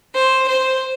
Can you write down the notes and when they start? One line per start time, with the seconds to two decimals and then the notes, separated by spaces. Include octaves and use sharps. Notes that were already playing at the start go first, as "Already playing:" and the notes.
0.14 C5
0.48 C5